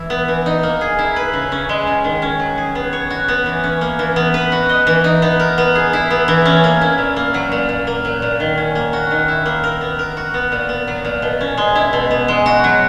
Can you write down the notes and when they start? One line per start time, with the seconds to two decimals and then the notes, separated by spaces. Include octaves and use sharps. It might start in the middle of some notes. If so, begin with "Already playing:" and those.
Already playing: E3 E4
0.10 B3
0.28 E3
0.46 D#4
0.63 A#3
0.81 G#4
0.99 E4
1.16 B4
1.33 C#3
1.52 C#4
1.69 G#3
1.87 C#3
2.04 D#3
2.22 C#4
2.39 F#3
2.58 G#4
2.75 B3
2.93 C#5
3.10 F#4
3.28 B3
3.46 E3
3.64 C#4
3.81 A#3
3.99 E3
4.16 B3
4.34 B4
4.52 F#4
4.69 D#5
4.87 E3
5.04 D#4
5.22 B3
5.40 A#4
5.58 B3
5.75 G#4
5.93 E4
6.10 B3
6.28 E3
6.46 C#4
6.64 A#3
6.81 E4
6.98 A#2
7.16 A#3
7.34 F#3
7.52 A#2
7.69 A#2
7.87 A#3
8.05 F#3
8.22 A#2
8.40 D#3
8.58 C#4
8.75 A#3
8.93 F#4
9.11 D#3
9.28 E4
9.46 A#3
9.64 A#4
9.81 B3
9.99 A#4
10.17 F#4
10.34 B3
10.52 A#2
10.69 B3
10.88 F#3
11.05 A#2
11.22 B2
11.41 C#4
11.58 G#3
11.75 E4
11.93 B2
12.11 B3
12.28 G#3
12.46 F#4
12.64 F#3